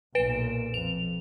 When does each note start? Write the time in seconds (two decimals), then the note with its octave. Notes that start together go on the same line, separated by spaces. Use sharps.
0.15 B1 A#2 B4 D7 E7
0.74 F2 F7